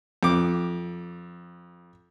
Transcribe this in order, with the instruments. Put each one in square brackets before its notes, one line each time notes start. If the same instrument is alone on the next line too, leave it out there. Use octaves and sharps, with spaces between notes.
[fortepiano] F2 D6